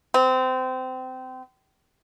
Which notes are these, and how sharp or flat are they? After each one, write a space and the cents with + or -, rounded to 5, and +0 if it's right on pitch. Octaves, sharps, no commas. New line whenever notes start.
C4 -25